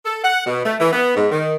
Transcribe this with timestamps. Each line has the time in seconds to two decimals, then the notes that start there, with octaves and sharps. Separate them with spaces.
0.05 A4
0.23 F#5
0.46 B2
0.64 A3
0.79 E3
0.92 B3
1.15 G#2
1.31 D#3